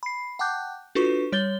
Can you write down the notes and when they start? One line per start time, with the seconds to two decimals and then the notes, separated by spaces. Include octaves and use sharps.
0.03 B5 C7
0.39 F#5 G5 A5 D6 F#6 G6
0.95 D4 F4 F#4 A4 B4 C#6
1.32 G3 C#5 G6 A6 G7